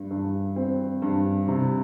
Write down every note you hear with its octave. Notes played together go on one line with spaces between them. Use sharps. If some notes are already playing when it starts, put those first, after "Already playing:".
Already playing: G2
G2
C4
G2
C3